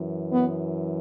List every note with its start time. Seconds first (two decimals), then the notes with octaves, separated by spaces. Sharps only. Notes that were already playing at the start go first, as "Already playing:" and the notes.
Already playing: F#2 E3
0.33 B3